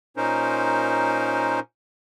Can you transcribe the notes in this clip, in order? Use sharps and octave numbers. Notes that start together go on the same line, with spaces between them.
A#2 C#4 D#4 A#4 C5